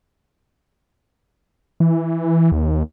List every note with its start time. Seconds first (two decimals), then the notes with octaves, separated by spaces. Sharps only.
1.80 E3
2.52 D#2